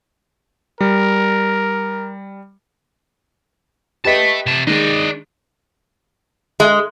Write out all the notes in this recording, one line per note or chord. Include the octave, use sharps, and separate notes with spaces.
G3 A#4
G4 B4 D#5 E5 A5
C3 A5
D#3 G#3 D4 D#5
G#3